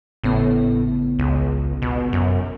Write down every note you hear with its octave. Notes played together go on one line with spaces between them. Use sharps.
G#1 A2 C#3 B3
C#2
B2
F#2